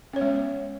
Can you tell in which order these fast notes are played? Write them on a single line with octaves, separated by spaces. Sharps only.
C#4 C#5 B3 G#3